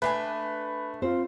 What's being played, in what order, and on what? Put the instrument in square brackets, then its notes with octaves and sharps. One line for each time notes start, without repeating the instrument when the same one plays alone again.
[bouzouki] A3 D4 G#5 [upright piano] B4
[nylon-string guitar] C4 C5 [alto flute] F4